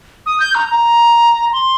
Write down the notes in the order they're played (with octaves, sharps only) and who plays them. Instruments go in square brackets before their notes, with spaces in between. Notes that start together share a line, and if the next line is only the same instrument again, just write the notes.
[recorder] D#6
G6
A#5
A#5
C6